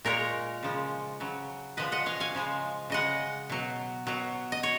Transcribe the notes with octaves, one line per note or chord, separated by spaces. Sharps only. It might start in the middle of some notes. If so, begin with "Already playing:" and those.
A#2 G#3 A#4 C#5
C#3 F3 G#3
C#3 F#3
A#2 F3 G#3 B4 D#5
D#5 F#5
C#5 F5
F5 G#5
C#3 F3 G#3
C#3 G#3 D#5 F#5
B2 F#3
B2 F#3
D#5
C#5